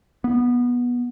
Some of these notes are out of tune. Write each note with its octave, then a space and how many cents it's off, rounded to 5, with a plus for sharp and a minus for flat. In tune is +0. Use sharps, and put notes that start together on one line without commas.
B3 -15